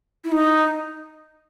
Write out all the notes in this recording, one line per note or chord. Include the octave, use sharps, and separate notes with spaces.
E4
D#4